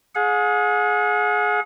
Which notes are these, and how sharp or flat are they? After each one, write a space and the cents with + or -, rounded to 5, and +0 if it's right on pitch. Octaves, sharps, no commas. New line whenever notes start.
G#4 +20 F#5 -40